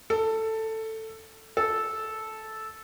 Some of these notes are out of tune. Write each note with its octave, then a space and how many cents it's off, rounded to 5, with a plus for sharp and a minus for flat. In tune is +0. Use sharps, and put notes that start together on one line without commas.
A4 +10
A4 -10